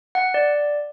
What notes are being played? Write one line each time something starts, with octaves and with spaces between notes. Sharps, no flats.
F#5
D5